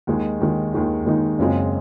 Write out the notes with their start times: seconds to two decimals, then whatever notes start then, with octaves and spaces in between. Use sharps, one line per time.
0.07 D#2 D#3 G#3 D#4
0.40 D#2 D#3 G#3 D#4
0.73 D#2 D#3 G#3 D#4
1.06 D#2 D#3 G#3 D#4
1.39 F#1 F#2 C#3 G#3 C4